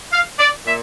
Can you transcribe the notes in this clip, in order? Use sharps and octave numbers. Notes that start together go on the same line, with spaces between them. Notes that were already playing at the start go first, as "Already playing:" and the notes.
F5
D5
A#2 E5